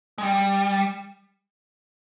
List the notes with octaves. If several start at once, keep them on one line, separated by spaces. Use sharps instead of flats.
G#3
G3